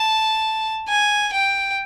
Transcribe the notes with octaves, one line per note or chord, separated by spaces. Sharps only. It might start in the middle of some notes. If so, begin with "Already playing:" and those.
Already playing: A5
G#5
G5